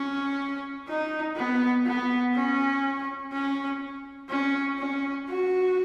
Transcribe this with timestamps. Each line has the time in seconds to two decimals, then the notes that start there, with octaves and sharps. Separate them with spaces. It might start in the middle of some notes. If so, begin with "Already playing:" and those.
Already playing: C#4
0.88 D#4
1.36 B3
1.86 B3
2.35 C#4
3.32 C#4
4.30 C#4
4.79 C#4
5.28 F#4